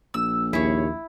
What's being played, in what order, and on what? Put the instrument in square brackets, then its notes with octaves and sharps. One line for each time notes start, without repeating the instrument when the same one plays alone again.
[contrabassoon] A#1 [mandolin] E6
[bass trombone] D#2 [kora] E4 [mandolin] G#4 C#5